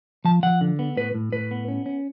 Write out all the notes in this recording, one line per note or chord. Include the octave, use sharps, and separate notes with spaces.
F3 A5
F3 F#5
D3
B3
A2 B4
A2
A2 B4
B3
C#4
C#4